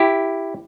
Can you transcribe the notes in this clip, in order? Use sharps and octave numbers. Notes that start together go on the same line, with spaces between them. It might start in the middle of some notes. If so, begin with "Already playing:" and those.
Already playing: E4 G4